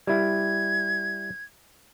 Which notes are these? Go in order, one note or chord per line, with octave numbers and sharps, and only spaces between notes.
G3 E4 G#6